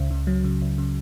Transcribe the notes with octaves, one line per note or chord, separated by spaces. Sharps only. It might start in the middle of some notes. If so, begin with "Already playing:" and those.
Already playing: C#2 C#3
C#3
F#3
C#3
C#2
C#3